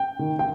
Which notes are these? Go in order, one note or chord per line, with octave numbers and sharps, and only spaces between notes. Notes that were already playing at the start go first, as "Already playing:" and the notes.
Already playing: G5
D#3
G5